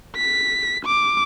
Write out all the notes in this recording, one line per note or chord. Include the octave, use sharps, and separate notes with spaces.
B6
D6